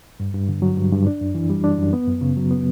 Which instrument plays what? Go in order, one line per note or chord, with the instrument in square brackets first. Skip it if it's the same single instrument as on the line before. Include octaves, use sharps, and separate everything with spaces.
[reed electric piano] G2
G2
D3
F#3
G2
G2
D4
F#2
E3
G3
D4
F#2
B3
F#2
C#3
F#3
B3